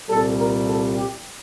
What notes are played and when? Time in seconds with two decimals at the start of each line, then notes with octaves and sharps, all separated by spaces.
0.09 C2 A#2 G3 A4
0.38 A#4
0.67 A4
0.96 G4